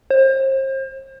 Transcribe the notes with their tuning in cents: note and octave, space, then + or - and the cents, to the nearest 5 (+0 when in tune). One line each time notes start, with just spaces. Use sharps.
C5 +35